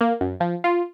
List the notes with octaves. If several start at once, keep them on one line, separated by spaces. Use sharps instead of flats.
A#3
F#2
F3
F4